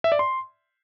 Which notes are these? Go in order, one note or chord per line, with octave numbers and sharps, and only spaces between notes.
E5
D5
C6